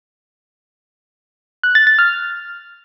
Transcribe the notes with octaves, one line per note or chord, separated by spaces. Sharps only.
F#6
A6
A6
F6